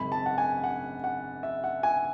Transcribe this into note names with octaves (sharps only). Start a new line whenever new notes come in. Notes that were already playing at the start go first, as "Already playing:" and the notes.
Already playing: G#1 F#2 C#3 B5
A5
F#5
G#5
F#5
F#5
E5
F#5
G#5